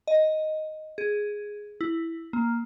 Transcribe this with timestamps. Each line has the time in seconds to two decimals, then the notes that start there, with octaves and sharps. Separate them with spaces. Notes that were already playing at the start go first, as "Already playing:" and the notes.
0.07 D#5
0.98 G#4
1.81 E4
2.33 A#3